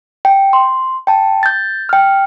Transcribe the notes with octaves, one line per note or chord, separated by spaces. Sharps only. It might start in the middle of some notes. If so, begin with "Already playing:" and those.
G5
C6
G5 A5
G6 A6
G5 F6